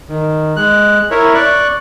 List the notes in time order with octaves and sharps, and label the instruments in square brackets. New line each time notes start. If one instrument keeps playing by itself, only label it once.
[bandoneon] D#3
G#3 F#6
E4 A#4 C#5 E5
D5 C#6 F#6